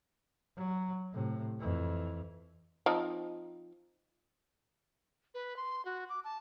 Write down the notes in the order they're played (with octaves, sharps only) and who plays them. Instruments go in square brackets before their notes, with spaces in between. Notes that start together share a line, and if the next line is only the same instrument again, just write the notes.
[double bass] F#3
A2 C3
F2 E3
[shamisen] F3 C4 D#4
[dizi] B4
C6
F#4
D6
A5